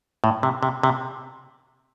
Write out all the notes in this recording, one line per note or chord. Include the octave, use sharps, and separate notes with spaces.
A2
C3
C3
C3